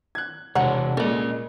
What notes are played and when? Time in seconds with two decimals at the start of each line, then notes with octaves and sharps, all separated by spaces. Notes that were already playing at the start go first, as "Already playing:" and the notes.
0.15 F#6 G#6
0.55 E1 C3 D4 C#5 F#5 A#5
0.97 A#2 G#3 C#4 A4 D5 D#5